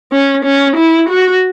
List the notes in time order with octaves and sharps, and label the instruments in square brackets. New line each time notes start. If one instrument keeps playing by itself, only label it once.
[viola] C#4
C#4
E4
F#4